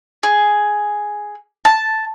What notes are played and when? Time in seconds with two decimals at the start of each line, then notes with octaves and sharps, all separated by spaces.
0.23 G#4
1.65 A5